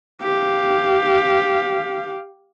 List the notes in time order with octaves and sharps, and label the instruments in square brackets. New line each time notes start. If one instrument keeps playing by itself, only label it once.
[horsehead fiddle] G4 F5